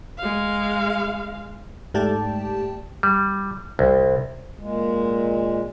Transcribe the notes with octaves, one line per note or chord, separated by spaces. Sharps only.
G#3 F5
G#2 A3 G4 D5 G5 A5
G3
C2
A#2 G#3